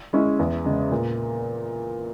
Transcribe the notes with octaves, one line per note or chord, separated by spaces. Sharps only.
G#3 C#4 E4
E2
C#3 G#3
A#2